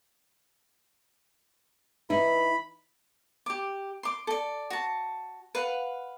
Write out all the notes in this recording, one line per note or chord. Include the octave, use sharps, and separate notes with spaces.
E3 D#4 E4 B5
G4 D6
C6 D6
A4 D5
F#4 A5
B4 F5 F#5